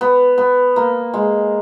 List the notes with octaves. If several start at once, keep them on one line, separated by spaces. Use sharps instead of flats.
B3
B3
A#3
G#3